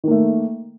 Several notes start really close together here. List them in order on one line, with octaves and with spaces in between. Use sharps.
D#3 A#3 A3